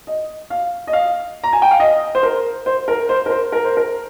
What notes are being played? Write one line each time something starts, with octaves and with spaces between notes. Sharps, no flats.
D#5
F5
D#5
F5
A#5
G#5
G5
F5
D#5
C5
A#4
C5
A#4
C5
A#4
C5
A#4
C5
A#4